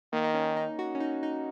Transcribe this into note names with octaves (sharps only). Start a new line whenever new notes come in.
D#3 A#3
D#4
C#4
D#4
F#4
C#4
D#4
D#4